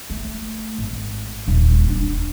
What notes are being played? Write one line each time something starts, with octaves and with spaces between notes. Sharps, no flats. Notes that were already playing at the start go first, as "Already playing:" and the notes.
A3
G#1
D#1 D#4
C4 D4